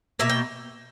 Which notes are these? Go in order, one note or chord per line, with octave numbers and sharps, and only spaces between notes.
B2 A#3 E5
G5